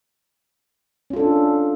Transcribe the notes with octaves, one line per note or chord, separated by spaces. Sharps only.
C#4 D4 F4 A4